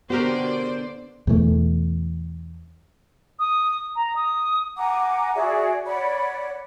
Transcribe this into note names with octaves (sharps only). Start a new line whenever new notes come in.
D3 B3 F#4 G4 A#4 C5 D5
E2 B2 E3 A3
D#6
A#5
D#6
F#5 G#5 A#5 D6
F#4 G#4 D5 E5
C#5 D5 F#5 B5